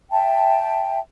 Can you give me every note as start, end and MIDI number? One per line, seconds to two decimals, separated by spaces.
0.11 0.98 76
0.11 0.98 79
0.11 0.98 81